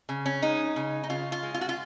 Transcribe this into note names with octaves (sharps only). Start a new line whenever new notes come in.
C#3
C#4
G#3 D#4
C#3
D#4
C#3 F4
F4
G#3
F4
F#4
F4